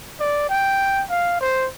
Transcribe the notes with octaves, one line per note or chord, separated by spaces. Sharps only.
D5
G5
F5
C5